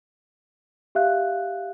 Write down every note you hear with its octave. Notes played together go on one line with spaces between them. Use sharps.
G4 E5 F5 F#6